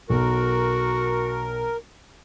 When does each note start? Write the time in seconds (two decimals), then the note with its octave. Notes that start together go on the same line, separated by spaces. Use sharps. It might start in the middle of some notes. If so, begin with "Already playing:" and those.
0.10 B1 F#4 A#4